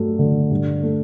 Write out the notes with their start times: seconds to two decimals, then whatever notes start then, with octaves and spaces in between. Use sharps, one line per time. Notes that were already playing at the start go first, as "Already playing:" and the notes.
Already playing: G2 F#3 A3
0.19 D3
0.51 G2
0.83 A3